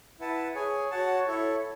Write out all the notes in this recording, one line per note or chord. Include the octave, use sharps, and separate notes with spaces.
E4 B4 F#5 A5
G#4 C#5 G#5
F#4 C#5 F#5 A5
E4 A4 C#5